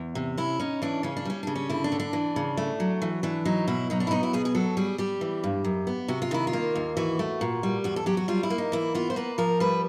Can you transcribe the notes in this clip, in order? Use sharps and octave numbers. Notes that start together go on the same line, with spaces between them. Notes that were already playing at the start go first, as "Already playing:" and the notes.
Already playing: E2
C3
C#4 E4
C#4 D#4
E3 D4
C#3 C#4
D4
G3 C#4
C#3 D4
C#4
D3 E4
D4
D3
D4
E3
C#3
A3
F#3
E3
E3 D4
F#3 D#4
B2 E4
F#3 D#4
D4
E4
B3 D#4
E4
B2 G#4
G#4
F#3 A4
G3 G#4
G3 G4
E3
G2
F#2
B3
C3 F#4
F4
D#3 E4
F4
A#3
D#2
E3 F#4
A3
A#2
G3
E2 F#4
A4
F#3 G4
F#4
G3 F4
E4
A#3
D#4
E3 E4
B3 F4
C5
A#3 B4
F3 A#4
G3 B4